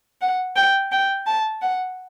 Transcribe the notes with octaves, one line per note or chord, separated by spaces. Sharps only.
F#5
G5
G5
A5
F#5